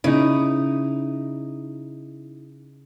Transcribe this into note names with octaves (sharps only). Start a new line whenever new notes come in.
C#3 D#4 E4